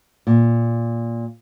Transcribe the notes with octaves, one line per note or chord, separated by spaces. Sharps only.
A#2